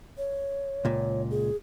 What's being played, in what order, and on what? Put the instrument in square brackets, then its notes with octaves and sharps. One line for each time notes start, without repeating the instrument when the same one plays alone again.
[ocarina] C#5
[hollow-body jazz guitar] C#2 A#2
[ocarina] G#4